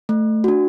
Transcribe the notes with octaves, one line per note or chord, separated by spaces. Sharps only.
A3
D4 F#4